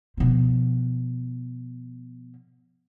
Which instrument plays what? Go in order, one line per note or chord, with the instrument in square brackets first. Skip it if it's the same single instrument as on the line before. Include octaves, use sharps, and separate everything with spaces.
[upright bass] B2 F3